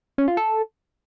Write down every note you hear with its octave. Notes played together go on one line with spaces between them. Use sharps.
C#4
F4
A4